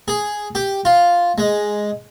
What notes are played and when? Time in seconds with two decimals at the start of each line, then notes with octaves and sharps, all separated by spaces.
0.08 G#4
0.55 G4
0.85 F4
1.38 G#3